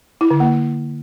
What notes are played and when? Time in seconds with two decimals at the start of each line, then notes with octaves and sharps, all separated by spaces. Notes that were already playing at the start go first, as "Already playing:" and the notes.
0.21 E4
0.31 D3
0.40 A#3